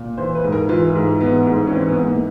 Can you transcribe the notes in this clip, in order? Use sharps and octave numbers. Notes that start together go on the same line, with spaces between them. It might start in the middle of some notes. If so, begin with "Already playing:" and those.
Already playing: A#2
E3 C5
B4
G#2
A#4
E3 F4
G#2
E3 B3
G#2
C#4
E3 C4
B3
G#2
A#3